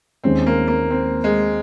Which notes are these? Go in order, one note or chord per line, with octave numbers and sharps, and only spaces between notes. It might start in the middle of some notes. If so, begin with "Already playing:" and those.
D#2 D#3 G#3 C4 C#4
A#3
A#3
C4
G#3